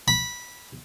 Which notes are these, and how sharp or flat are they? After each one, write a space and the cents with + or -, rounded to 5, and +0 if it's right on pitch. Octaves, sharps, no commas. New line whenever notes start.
B5 -15